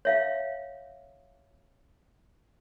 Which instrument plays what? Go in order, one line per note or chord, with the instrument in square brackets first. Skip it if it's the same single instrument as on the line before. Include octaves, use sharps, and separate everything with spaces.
[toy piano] C#5 E5 F5